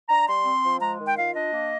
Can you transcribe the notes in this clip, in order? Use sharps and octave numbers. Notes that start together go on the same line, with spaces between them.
D4 A#5
G3 C6
C4
F3
G#3 A#5
D#3
G5
F4 F5
D4 D#5
A#3